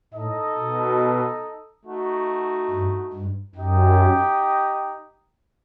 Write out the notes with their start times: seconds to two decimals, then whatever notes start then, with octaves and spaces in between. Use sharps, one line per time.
0.13 A2 D#4 A4 D#5
0.56 B2
1.84 A3 D#4 F#4
2.70 G2
3.13 G2
3.55 F#2 D#4 G4 D#5 G5